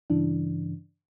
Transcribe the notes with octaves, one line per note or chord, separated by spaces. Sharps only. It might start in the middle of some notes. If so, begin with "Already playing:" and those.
G2 C#3 E3 D4